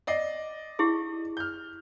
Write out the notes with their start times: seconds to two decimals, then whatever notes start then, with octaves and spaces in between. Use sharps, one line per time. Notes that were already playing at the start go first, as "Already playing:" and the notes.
0.07 D5 D#5 C7
0.79 E4 G4 G#4
1.37 F6 G6